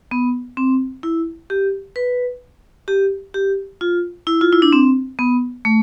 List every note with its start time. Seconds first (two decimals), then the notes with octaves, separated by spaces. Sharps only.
0.11 B3
0.57 C4
1.03 E4
1.50 G4
1.96 B4
2.88 G4
3.34 G4
3.81 F4
4.27 E4
4.41 F4
4.53 E4
4.62 D4
4.73 C4
5.19 B3
5.65 A3